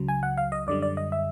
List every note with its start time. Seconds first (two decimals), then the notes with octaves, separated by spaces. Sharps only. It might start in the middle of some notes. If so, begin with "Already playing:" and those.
Already playing: C#2 C#3 F#3
0.08 G#5
0.23 F#5
0.37 F5
0.52 D#5
0.67 F#2 D3 G3 D5
0.82 D5
0.97 D#5
1.12 E5